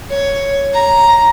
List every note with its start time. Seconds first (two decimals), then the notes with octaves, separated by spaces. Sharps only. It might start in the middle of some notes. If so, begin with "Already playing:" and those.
0.10 C#5
0.73 A#5